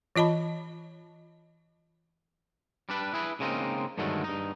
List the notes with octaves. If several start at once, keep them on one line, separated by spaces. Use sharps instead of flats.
E3 F4 D#5 A5 B5
G3 D4 B4
E4 G#4 B4
C#3 G#3 A#3 C4 D#4
G2 D3 D#3 F#3 G#3 A3
G2 D#4